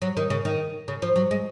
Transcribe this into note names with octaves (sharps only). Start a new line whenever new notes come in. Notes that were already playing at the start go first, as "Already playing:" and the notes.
F#3
D#3
C#3
D#3
C#3
F3
F#3
G#3